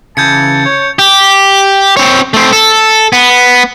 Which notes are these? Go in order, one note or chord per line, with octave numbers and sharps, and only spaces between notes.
C#3 E3 A5 G6 G#6 C#7
C#5
G4
C4 C#5
A3 C4
A4
B3